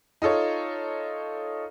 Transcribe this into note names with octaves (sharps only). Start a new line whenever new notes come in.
D#4 F4 A4 C#5